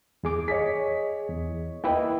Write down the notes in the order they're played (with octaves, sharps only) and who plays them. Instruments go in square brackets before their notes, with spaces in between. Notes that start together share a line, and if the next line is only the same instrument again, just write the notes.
[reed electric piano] E2 G#4 D6
[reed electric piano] G#4 [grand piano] C#5 D#5 B6
[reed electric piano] E2
[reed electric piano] A#3 E4 B4 [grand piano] D#5 G5